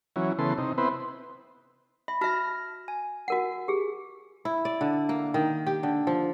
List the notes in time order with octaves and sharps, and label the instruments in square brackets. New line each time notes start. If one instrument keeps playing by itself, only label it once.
[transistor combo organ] E3 F#3 C#4
C#3 E3 B3 A4 C6
C3 D#4
B3 C4 E4 B4 C5
[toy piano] E5 [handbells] B5
[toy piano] F#4 E5 [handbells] A5 F6 A#6
[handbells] G#5
[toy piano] F#4 A#4 F#5
G4 G#4
[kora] E4
D5
D3
A#3
D#3
G4
D3
F3